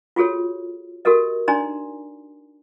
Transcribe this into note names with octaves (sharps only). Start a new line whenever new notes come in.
F4 F#4 G#4 A4 C#5
F#4 G4 A4 A#4 D#5
D4 D#4 D5 G#5 A#5 C6